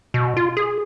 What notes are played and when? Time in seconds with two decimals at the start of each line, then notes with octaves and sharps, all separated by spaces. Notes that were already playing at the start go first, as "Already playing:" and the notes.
0.14 B2
0.37 F4
0.57 G#4